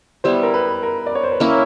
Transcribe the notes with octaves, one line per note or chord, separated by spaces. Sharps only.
G3 B3 E4 C5
A#4
B4
A#4
D5
C#5
C5
B4
A#3 C#4 E4 A#4